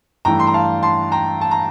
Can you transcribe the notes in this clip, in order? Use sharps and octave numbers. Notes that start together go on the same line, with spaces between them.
G2 E3 A3 D4 G5 A#5
C6
A#5
F5 A5
A5 C6
G5 A#5
A5
A#5